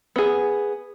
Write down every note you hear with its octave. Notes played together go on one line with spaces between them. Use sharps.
B3 G#4